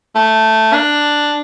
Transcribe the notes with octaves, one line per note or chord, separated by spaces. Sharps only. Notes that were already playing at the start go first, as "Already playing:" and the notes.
A3
D4